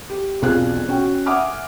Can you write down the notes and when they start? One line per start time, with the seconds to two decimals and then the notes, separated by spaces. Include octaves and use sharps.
0.10 G4
0.42 E1 B1 C4 F4 G#4 F#6
0.88 C#4 F#4 G5
1.26 E5 F#5 G#5 D6 D#6 F6